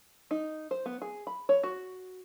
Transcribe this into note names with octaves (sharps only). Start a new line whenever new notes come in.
D#4
C5
B3
G#4
B5
C#5
F#4